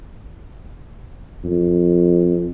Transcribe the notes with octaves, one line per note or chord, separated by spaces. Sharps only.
F2